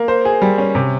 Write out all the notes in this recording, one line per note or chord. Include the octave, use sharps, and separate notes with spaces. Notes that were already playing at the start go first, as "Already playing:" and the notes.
Already playing: A#3
C5
G#4
G3
C#4
C3